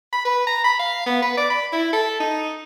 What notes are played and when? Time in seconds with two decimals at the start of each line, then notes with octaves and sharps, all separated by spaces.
0.13 B5
0.25 B4
0.47 A#5
0.64 B5
0.80 F5
1.06 B3
1.22 B4
1.37 D5
1.50 B5
1.72 E4
1.93 A4
2.20 D#4